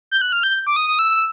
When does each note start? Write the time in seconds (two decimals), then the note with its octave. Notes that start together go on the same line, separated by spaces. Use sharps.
0.11 G6
0.21 F#6
0.32 F6
0.43 G6
0.67 D6
0.76 D#6
0.88 D#6
0.99 E6